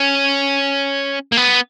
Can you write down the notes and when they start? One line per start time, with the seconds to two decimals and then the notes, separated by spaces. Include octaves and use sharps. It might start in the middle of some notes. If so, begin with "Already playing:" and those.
Already playing: C#4
1.32 A#3
1.37 B3